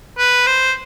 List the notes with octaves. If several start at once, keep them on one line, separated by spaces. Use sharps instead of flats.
B4
C5